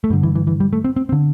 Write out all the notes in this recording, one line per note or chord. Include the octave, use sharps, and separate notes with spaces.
A3
G2 D3 G3
E3
E3
E3
G3
A3
C4
C4
C4
D3